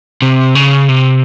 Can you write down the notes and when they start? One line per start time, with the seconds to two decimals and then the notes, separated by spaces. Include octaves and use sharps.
0.22 C3
0.55 C#3
0.89 C3